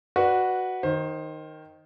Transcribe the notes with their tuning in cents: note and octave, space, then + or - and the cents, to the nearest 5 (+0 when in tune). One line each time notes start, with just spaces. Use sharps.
F#4 +0 B4 -15 D5 +0
D#3 +0 C5 +20